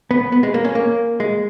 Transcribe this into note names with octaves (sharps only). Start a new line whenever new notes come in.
B3
B3
G#3
A#3
C#4
A#3
G#3